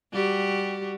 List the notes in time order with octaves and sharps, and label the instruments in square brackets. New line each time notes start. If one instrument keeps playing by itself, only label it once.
[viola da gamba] G3 F#4 G4